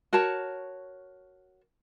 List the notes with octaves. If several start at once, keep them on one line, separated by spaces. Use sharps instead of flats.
F#4 A#4 C#5 A5